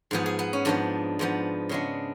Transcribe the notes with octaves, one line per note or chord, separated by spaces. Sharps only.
G#2 F3 B3 G#4
G#4
B3
C#4
G#2 F3 B3 D4
G#2 F3 B3
C#3 G#3 B3 D4